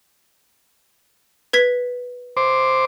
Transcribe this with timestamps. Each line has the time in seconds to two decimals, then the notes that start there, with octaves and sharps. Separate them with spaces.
1.53 B4 G#6 B6
2.37 C5 D6